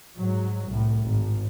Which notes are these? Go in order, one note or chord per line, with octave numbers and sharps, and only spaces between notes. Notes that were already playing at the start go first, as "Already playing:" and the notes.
G#2 F#3
C2 A2
G#1